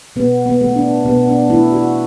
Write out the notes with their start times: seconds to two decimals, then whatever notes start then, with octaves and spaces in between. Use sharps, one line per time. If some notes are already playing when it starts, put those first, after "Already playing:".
0.16 B2 B3
0.46 B3
0.61 A3
0.76 D4
1.05 B2 B3
1.28 D4
1.50 A3 E4
1.72 F#4